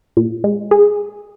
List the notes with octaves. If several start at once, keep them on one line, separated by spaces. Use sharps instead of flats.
A#2
G#3
G#4